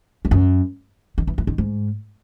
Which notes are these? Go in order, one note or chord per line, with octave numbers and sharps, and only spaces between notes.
E2
F#2
D#3
E3
E3
D#3
G#2